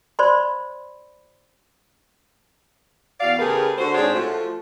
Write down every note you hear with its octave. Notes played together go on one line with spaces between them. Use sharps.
C5 D5 B5 C6
E2 F#4 D5 F5
C#3 A3 G4 G#4 A#4 B4
D3 F#4 C5
G#2 C4 D4 G#4 C#5
F3 A3 F#4